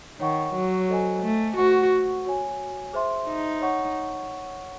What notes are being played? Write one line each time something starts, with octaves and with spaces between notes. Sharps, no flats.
D#3 C#5 F#5 C#6
F#3
A4 C5 D#5 G#5
A3
F#4 C5 F#5 C#6
F#4 C#5 G#5
G#4 C5 E5 C6
D#4
C#5 F#5 C#6